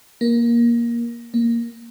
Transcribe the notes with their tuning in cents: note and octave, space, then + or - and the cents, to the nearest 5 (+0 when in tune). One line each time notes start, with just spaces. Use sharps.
A#3 +15
A#3 +0